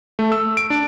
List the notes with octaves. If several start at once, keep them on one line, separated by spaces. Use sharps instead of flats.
A3
E6
D7
D4